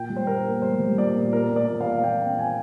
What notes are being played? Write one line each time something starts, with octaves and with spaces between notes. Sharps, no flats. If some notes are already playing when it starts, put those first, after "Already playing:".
Already playing: A#2 G5
G3
C5
A#3 A#4
A#3
G3 C5
G3
A#2 D5
A#2
A#2 A#4
A#2
D5
A#2
F5
A#2
A#2 G5
C4
C4 G#5